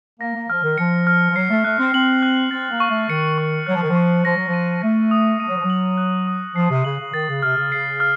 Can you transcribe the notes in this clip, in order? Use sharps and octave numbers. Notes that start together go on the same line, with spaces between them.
A#3 A#6
A#3
F3 F6
D#3
F3 C#7
F6
F3
F#3 C7
A3
A3 F#6
C4
C4 F#7
F#6
C4 A6
A#3
C#6
A3
D#3 C#7
C#6
F#3 F#6
F3
D#3
F3
C#6
F3 A#6
F#3
F3
D#7
A3 A#6
D#6
A3 D#7
F#3
F3
F#3
F#7
F#6
D#6
F3 C7
C3
C#3 F#7
C#3
D#3 A6
C#3
C3 F6
C#3
C#3 C7
F6